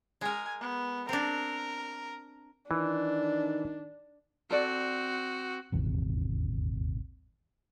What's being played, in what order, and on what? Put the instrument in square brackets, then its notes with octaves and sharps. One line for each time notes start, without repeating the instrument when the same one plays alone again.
[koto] G#3 A#4 [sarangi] G#5
[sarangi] B3
[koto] C4 D4 [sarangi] A#4
[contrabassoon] D#3 [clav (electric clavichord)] E3 [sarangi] D4
[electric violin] C4 F#4 [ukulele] A4 D5
[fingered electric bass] D#1 G#1 E2 C3